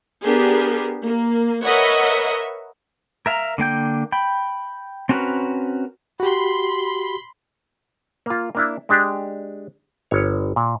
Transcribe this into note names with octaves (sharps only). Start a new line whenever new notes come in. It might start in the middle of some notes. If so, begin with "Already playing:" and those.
B3 D4 G4 G#4 A#4
A#3
A#4 B4 C#5 D#5 E5 F#5
A#4 E5 F5 A#5
D3 A#3 G5 G6
G5 B5
C4 C#4 F#4 A#4 B4
F#4 G4 B5 C6
A#3 F4
A#3 D4 E4
G#3 D4 G4
G1 C#5
A#2